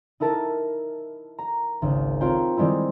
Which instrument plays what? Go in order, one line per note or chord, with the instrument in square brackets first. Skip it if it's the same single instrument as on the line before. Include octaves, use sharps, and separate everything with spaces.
[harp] D#4 E4 A#4 A5
A#5
G#1 C#2
C4 F4 C#5 F5 G5 A#5
D#3 G3 G#3 C4 E4